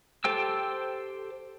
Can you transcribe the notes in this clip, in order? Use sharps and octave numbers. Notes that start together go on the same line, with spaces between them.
G4 A4 C5 G5 E6